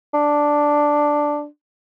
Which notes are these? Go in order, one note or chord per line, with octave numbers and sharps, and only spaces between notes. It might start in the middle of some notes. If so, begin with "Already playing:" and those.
D4